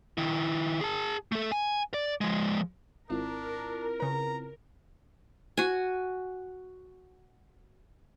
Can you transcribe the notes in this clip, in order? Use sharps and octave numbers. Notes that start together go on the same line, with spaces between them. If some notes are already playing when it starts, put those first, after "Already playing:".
D#3 E4
G#4 A5
A3 A4
G#5
D5
F3 G#3
G#1 C4 D4 E4 F4 A#4
C#3 B4 A#5
F#4 G#5